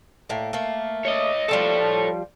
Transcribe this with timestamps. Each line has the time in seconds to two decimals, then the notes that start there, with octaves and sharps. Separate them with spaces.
0.29 A2 A#3
0.53 A3 A#3
1.05 C#5 D#5
1.49 F3 G3 F4 A4 C#5